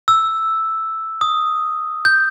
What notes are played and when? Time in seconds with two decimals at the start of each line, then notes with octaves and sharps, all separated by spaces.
0.08 E6
1.21 D#6
2.05 G6